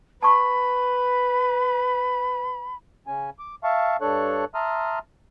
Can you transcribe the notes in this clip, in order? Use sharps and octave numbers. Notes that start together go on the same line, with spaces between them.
B4 A5 B5 C#6
C#3 C#4 G#5
D6
E5 F5 A5 C#6
G2 D4 A4 C#5 C#6 F#6
E5 A5 A#5 C6 D#6 F6